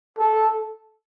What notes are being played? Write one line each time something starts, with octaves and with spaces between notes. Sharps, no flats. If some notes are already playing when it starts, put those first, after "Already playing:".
A4